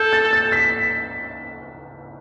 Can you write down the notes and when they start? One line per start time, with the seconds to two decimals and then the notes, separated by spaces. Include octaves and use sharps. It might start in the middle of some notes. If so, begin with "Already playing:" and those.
Already playing: A4 G6
0.13 A6
0.33 A6
0.52 B6